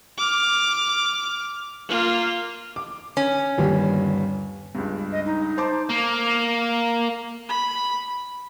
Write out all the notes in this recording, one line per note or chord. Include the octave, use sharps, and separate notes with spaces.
D6 F6
A#3 F4
D6
C#4
G1 D#2 G3
C#2 G2
D#5
D#4
C5 A5 D6
A#3
B5